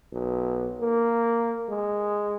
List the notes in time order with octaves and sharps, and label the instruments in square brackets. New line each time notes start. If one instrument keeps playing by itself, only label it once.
[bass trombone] B1
A#3
G#3